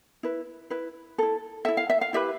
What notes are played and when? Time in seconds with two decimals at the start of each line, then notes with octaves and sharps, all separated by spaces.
0.23 E4 B4
0.70 E4 B4
1.18 E4 A4
1.65 E4 A4 E5
1.77 F5
1.90 E5
2.01 F5
2.13 E4 G4 B4 E5